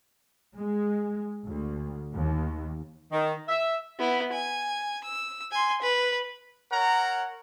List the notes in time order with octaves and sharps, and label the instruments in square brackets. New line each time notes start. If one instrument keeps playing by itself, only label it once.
[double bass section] G#3
D2
D#2
[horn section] D#3
E5
[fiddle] B3 E4
G#5
E6
G#5 C6
B4
[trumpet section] A#4 C#5 F#5 A#5